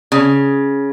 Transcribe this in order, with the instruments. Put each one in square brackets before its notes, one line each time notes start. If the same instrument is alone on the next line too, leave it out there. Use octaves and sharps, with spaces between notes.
[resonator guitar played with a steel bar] C#3